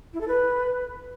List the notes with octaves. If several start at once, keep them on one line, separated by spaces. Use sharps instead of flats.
E4
A4
B4